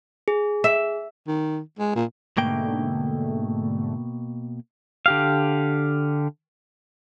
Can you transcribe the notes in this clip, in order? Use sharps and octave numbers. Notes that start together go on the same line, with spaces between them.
G#4
E5
D#3
G#3
A#2
G#2 B2 D3 A3 A#3 G5
D3 G4 F5